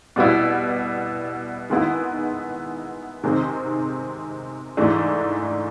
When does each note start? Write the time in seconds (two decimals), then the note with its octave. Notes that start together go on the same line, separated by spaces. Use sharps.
0.16 B2 G3 B3 E4
1.70 D#3 G#3 B3 E4
3.24 C3 D#3 G#3 C4
4.77 G#2 E3 A3 D4